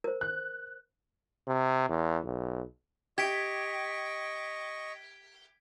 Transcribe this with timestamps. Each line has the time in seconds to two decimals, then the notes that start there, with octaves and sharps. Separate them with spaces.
0.04 A#4 C5
0.21 F#6
1.47 C3
1.89 E2
2.24 B1
3.18 G4 D#5 C#6 G#6 B6 D7